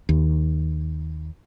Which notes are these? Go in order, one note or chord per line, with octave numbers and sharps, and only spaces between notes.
D#2